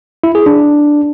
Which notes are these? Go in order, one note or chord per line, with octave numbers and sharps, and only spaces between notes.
E4
G#4
D4